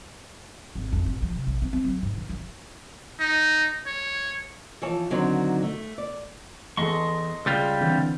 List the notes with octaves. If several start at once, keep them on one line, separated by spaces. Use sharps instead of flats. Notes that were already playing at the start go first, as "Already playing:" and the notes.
G#1
F2
A1
F3
C3
A#1
C4
C4
F#3
G#2
E3
F3
D#4
C#5
E3 F3 C#5 A5
D3 D#3 F#3 C4 D#4
A3
D5
E2 A4 D#5 C6 C#6
C#2 G3 G#3 F4
D3 E3 C4